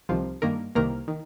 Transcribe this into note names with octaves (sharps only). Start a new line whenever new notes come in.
C2 C3 D#3 F3 F4
G2 D#3 A#3 A#4
C2 C3 D#3 A#3 A#4
D#3